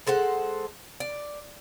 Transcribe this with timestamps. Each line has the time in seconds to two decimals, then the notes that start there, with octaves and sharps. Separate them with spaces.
0.07 G#3 A4 C5 F#5
1.00 D5